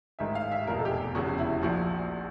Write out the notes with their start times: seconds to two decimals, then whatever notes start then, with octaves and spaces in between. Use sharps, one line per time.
0.19 A1 G#2 D#3 E5
0.35 F5
0.51 E5
0.66 F1 E2 B2 A#4
0.79 A4
0.85 G4
0.91 G#4
1.14 F1 E2 C#3 F#4
1.38 E4
1.62 A#1 A#2 F3 F#4